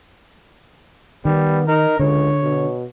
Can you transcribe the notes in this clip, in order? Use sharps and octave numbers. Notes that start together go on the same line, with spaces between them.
D#3 G3 B3
D#4 A#4
C#2 D3 C#5
B2